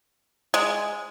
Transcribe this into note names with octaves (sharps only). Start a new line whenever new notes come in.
G#3